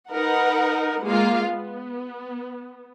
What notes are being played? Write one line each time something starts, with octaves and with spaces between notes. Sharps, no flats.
D#4 A#4 B4 F#5
G#3 A#3 F4 F5
B3